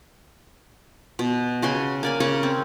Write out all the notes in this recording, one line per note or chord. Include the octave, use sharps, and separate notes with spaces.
B2
C#3 F#4 G#5 C6
A#3 D5 G#5
C#3 A#3 C#5 C#6
C4